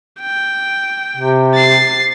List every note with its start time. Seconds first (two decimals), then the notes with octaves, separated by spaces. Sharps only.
0.20 G5
1.17 C3
1.54 A6 C7